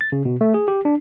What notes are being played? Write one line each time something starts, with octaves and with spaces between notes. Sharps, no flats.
A6
C#3
B2
A3
G#4
G4
D4